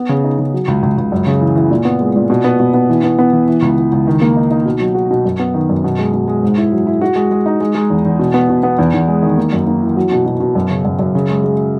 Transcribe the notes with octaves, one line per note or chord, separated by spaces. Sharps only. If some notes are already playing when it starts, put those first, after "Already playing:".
Already playing: B3
C#3
D#4
C#3
F#3
C#2
C#2
C#2
F#2
C#3
E3
E3
A#2
B3
G#3
A#2
B2
B3
B2
B3
E3
B3
B3
E3
E3
C#2
E3
C#2
D#3
A#3
D#4
D#4
B2
F#3
F#4
B2
F#2
B3
D#3
F#2
B2
G#3
B2
G#3
G#2
E4
F#3
E4
F#4
G#3
G#3
D#4
G#3
G#3
E2
E2
B2
B3
B2
B3
E2
E2
G#3
D#3
A#3
F#2
A#3
E3
F#3
B2
B2
B2
F#2
C#3
F#2
F#2
C#3
G#3
G#3